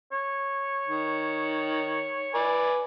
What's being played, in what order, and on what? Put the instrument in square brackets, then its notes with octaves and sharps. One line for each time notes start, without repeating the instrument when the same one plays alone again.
[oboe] C#5
[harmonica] D#3
[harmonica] B4 G#5 [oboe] D5